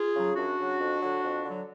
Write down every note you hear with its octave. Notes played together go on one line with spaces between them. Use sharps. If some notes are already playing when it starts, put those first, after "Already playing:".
Already playing: F4 G#4
C#3 F#3
F#2 D4 F#4
C#3 F#3
F2
D3 F#3
F2
D3 F#3